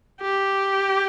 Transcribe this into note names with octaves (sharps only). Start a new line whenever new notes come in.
G4